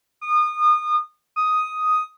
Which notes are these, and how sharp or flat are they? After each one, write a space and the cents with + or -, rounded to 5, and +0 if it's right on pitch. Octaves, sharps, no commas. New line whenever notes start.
D#6 -30
D#6 +5